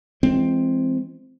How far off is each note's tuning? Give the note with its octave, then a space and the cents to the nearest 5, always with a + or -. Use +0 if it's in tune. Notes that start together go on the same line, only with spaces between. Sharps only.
E3 +35 G#3 +0 C4 +0